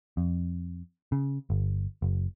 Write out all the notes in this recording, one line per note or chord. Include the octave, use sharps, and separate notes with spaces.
F2
C#3
G1
F#1